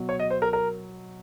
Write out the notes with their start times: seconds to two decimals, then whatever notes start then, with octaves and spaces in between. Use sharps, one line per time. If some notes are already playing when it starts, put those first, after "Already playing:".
Already playing: B2 F#3
0.09 C#5
0.20 D#5
0.30 C5
0.42 A#4
0.53 A#4